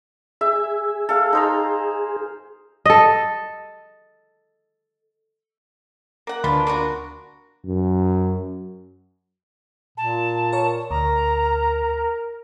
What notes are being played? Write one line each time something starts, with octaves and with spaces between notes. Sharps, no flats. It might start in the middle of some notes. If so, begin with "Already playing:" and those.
G#4 E5
A4 F5
D#4 C5 A#5
A4 D#5
A#3 F#5
D2 E3 A#3 D4 F4 B5
A#3 F4 F#4
F#2
A#2 A5
A#4 C#5 C#6
D2 A#4 A#5